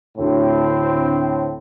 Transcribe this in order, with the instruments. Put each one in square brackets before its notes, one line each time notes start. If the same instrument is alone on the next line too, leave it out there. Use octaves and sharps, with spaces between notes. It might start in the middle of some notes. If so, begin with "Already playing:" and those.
[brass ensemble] D2 A2 C4